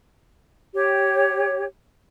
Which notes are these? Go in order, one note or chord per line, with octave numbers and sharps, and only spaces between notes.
G4 C#5